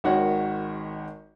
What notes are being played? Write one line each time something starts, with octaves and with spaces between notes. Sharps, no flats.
G#1 D#3 F#4 C#5 F#5